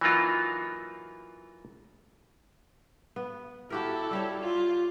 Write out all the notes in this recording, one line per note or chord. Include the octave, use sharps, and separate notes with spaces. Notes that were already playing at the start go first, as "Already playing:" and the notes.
E3 F#3 A#3 D#4 F4 F#4
B3
E4 F#4 G4 A4 A#4
G3 G4 C#5
F4